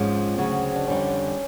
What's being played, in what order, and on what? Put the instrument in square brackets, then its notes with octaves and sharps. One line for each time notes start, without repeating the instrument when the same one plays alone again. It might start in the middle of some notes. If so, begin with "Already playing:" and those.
Already playing: [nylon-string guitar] G#2 F3 G#3 C#4 F4 [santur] C4
[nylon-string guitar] D2 C#3 F#3
[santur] D4
[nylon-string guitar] F2 D3 G3 [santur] C#4